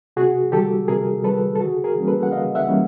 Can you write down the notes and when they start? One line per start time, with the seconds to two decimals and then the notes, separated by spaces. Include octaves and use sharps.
0.16 C3 F#4 G#4
0.52 D#3 G3 G4 A4
0.88 C3 G#4 A#4
1.24 D#3 G3 A4 B4
1.56 A4
1.60 C#3 F#4 G#4
1.84 G#4 A#4
1.96 E3 G3 A#3 C#4
2.08 A4 B4
2.23 F#5
2.31 C#3 D#5 F5
2.55 E5 F#5
2.67 E3 G3 A#3 C#4